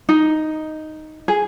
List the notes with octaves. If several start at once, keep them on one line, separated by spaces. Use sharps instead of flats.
D#4
G#4